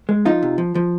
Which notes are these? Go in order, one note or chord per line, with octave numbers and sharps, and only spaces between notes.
G#3
F3 D#4 F4
C3
F3
F3